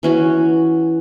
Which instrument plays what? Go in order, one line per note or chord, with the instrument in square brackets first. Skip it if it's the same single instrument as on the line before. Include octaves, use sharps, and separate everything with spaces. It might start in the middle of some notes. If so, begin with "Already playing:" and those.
[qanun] E3 C#4 F#4